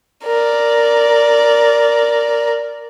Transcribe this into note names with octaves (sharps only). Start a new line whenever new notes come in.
A#4 D5